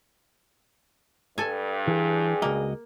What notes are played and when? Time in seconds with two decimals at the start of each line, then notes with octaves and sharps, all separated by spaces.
1.38 G2 A4 G#5
1.87 E3 G#4
2.42 C#2 A#3 F#4 D#5